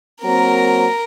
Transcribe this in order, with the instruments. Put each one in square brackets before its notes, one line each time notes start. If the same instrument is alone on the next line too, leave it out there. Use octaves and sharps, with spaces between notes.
[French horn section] F#3 A#3 C4 [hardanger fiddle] A#4 A#5